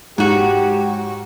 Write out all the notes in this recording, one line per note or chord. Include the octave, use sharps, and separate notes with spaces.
G#2 F#3 F#4 G4